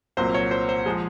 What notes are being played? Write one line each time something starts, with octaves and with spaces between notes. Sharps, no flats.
C2 A#2 F#3 A#3 C5
C#5
C5
C5
F3 G#3 G#4